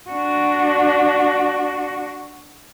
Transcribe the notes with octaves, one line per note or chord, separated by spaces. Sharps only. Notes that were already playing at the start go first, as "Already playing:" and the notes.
D4 F#4